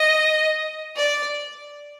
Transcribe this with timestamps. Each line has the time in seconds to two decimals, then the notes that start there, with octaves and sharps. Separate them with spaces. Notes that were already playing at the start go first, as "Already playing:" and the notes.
Already playing: D#5
0.96 D5